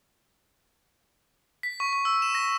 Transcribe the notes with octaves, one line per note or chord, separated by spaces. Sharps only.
B6
C#6
C#6
E6
E7
A#6